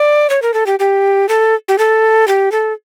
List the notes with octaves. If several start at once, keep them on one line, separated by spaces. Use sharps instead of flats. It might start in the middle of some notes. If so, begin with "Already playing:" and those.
Already playing: D5
C#5
A#4
A4
G4
G4
A4
G4
A4
G4
A4